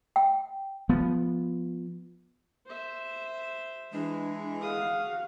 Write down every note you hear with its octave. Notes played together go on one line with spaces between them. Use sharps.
G5
F3 B3
C5 E5
E3 G#3 D4
F#4 G#4 F5 D#6